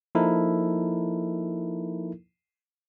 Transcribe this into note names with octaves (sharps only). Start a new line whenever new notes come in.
F3 A#3 D#4 E4 A4 A#4